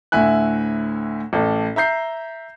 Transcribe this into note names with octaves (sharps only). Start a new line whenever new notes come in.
D2 A2 E5 G#5 F#6
A1 A4
E5 A#5 G6 C7